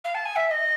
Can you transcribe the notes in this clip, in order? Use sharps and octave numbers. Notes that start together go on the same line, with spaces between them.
F5
A5
G#5
E5
E5
D#5